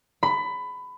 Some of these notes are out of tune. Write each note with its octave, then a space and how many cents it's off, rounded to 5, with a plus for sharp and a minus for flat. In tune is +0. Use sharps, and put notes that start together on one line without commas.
B5 +20